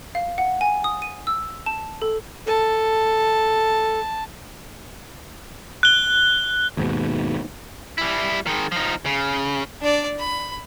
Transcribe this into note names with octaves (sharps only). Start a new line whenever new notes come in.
F5
F#5
G#5
D#6
D#7
E6
A5
A4
A4 A5
F#6 G7
D#2 G#2 B2
G3 E4
D#3 G#3
F3 D#4
C#3
D4 D5
B5